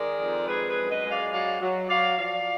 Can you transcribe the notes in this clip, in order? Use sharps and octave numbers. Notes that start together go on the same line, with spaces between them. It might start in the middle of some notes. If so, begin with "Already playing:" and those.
Already playing: D#3 G#3 A#4 D5
F2
G#3 G#4 B4
G#4 B4
F#2
B4 D#5
G#3
D5 F5
F#3 D5 F5
F#3
F#3 D5 F5
F3 D5 F5